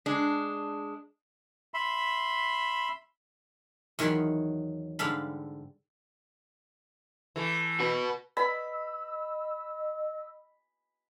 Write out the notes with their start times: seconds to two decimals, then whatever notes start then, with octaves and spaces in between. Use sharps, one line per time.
0.06 G#3 D4
1.74 E5 B5 C6
3.99 E2 D#3 F#3 C#5 B5 C6
4.99 G#2 D3 G3 A4 F5 B5
7.36 E3 A3
7.80 F#4 B4
8.37 B4 D5 D#5 B5 E6